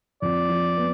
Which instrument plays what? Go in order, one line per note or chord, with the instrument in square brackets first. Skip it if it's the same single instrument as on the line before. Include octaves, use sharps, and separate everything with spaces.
[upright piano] F2 [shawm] D5
[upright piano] F3
B3